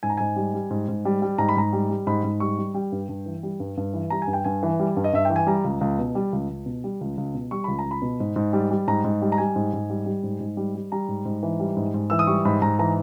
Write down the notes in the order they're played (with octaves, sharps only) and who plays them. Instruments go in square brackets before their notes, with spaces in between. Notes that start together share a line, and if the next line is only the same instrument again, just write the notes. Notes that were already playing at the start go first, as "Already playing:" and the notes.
[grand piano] G#2 G#5
A#5
G#2 G#5
G3
G3
G#2
G#2
G3
G3
G#2 A#5
B5
G#2 A#5
G3
G3
G#2 B5
G#2
G3 C#6
G3
G3 G5
G2
G2
E3
G3
G2
G2
E3
G3 A#5
G#5
G2
G5
G2 G#5
E3
G3
G2
D#5
G2 E5
E3 G5
G#5
G3 A#5
C#2
C#2
B2
G3
C#2
C#2
B2
G3
C#2
C#2
B2
G3 C#6
C#2 B5
A#5
C#2
B5
B2
G#2
G#2
G3
G3
G#2 A#5
G#2
G3
A#5
G3 G#5
G#2
G#2
G3
G3
G#2
G#2
G3
G3
G3 A#5
G#2
G#2
E3
G3
G#2
G#2
E3 E6
D#6
G3 C#6
G#2 B5
G#2 A#5
E3 A#5